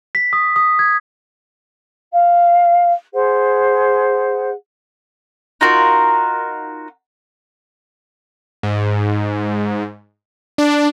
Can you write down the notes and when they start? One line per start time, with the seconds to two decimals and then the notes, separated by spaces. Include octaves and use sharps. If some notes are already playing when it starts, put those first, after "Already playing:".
0.15 B6
0.33 D#6
0.56 D#6
0.79 G#6
2.10 F5
3.13 G#4 C5 F#5
5.61 D#4 F4 F#4 A#4
8.63 G#2
10.58 D4